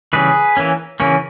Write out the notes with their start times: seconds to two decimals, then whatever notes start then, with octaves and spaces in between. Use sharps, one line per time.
0.13 C#3 E3 G3 G#4 B4
0.57 E3 A#3 C#4
1.00 C#3 E3 A#3 C#4